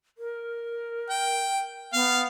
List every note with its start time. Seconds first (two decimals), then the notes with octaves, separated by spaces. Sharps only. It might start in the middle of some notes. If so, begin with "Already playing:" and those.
0.18 A#4
1.10 G5
1.93 B3 F5